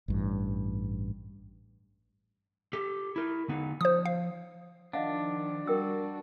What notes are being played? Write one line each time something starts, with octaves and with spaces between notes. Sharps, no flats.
A1 G2 E3
G4 A4
E4 A#4
D3 B3 D#4
F3 C5 D#6
F5
D#3 F3 D4 D#5 F5 F#5
G3 F#4 A#4 G5 E6